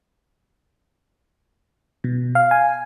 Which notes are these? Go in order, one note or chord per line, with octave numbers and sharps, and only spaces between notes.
B2
F5
G#5